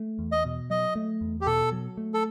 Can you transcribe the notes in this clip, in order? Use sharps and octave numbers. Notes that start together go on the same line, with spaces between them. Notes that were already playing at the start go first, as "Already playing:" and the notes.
Already playing: A3
E2
D#5
B2
F#3 D#5
A3
E2
G4
B2 A4
F#3
A3
A4